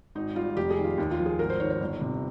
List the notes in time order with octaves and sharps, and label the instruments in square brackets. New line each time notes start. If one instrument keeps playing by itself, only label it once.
[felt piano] G#1 D#4
G3 F4
F1 G4
G#4
D#3
F4
D#2
F4
F3
G#4
G#1 A#4
C5
D#3 C#5
C#5
G1
C3